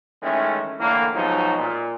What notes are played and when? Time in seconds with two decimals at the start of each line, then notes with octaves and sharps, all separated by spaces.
0.22 D#3 E3 G#3 A3 C#4
0.80 A2 D3 E3 A#3
1.14 G#2 B2 F3 F#3 B3 D#4
1.59 A#2